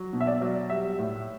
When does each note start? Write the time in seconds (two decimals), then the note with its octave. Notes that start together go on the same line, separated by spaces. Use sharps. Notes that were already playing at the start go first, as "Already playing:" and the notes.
Already playing: F#3
0.13 B2
0.20 E5
0.27 D5
0.42 F#3
0.70 G3 E5
0.99 A2